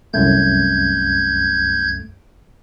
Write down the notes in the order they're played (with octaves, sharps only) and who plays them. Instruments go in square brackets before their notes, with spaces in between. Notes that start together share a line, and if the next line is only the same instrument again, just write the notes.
[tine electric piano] C2 F#2 A3 [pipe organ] G6 G#6